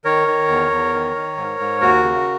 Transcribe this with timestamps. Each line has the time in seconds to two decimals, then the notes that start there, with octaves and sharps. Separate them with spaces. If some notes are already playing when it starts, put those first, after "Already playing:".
0.05 D#3 A#4 C#5
0.28 D#3
0.48 E2
0.70 E2
0.94 D#3
1.16 D#3
1.37 G#2
1.60 G#2
1.81 D#2 F#4 A#4
2.03 C#3